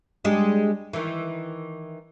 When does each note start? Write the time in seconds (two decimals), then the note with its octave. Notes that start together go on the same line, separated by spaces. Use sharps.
0.24 G3 G#3 D4
0.93 D#3 E3